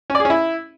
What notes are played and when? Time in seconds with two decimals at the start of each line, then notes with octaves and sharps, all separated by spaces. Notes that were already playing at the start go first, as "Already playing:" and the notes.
0.10 C#4
0.15 D5
0.20 G#4
0.25 C#4
0.30 E4